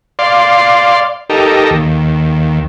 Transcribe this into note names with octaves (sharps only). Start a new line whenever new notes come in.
D5 F5 C6
D#4 G4 A4 A#4
D#2